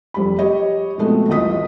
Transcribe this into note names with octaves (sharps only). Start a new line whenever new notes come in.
F1 G3 B5
G4 C#5 D#5
B2 F3 G#3 A3 B3 C4
D#1 A1 F4 D#5 D#6 B6